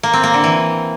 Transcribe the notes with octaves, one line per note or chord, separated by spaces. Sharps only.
A#3
C4
A#3
D3
E3